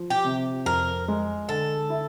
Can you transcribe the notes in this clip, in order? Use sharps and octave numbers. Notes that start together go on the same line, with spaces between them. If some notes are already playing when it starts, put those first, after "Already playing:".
Already playing: F3
G4
C3
F2 A#4
G#3
D3 A4
E4